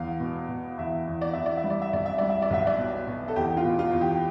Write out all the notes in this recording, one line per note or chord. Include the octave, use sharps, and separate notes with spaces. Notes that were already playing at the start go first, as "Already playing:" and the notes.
Already playing: E2 F5
B2
B2
E2 E5
E2
D5
E2 E5
D5
E5
G3
D5
E5
B1 D5
E5
G3 D5
E5
D5
B1 E5
D5
B2
B2
A4
E2 G4
F4
B2
F4
E2
G4